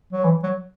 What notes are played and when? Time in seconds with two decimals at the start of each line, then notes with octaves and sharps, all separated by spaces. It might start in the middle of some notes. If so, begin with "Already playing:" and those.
0.13 F#3
0.24 E3
0.43 F#3